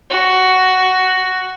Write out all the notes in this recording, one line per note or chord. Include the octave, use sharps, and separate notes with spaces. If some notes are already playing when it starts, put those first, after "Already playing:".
F#4